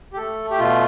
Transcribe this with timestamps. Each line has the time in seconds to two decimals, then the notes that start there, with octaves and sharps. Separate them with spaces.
0.13 G4
0.17 A3 A4
0.51 G4
0.59 B2 F4